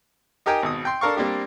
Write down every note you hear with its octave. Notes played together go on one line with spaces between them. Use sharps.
D#4 G4 A#4 G5 G#5
G#1 B2 D#6
G5 C6
D4 A4 A#4 F5 C#6
G3 A#3 C4 D4 G4